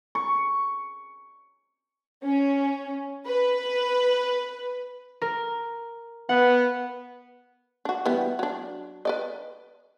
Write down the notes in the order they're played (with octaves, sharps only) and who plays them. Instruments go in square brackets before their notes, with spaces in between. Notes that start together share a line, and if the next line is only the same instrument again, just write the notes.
[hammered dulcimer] C#6
[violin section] C#4
B4
[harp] A#4
[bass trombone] B3 [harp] F#5
[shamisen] D4 F#4
E3 G3 B3
F#3 D4
B4 D5 D#5